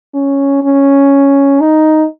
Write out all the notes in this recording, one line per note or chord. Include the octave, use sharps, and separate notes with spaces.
C#4
C#4
D#4